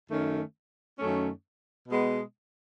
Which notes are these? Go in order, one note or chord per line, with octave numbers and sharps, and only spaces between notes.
F#2 D#3 A3 C#4
F#2 D#3 A3 C#4
B2 G#3 B3